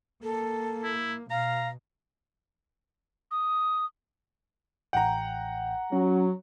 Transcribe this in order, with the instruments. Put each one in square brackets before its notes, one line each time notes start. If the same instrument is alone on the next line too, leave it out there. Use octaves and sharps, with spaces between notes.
[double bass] A#3 [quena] A4
[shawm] E4
[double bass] B2 [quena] F5 [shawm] A#5
[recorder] D#6
[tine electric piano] A1 G5 [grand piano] F#5 A#5
[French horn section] F#3 [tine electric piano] C#4